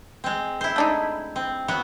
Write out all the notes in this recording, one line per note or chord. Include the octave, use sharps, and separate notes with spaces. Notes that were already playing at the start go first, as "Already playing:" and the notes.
G#3 C4
E4 C5
A3 D4 D#4
C4
F#3 B3 F#4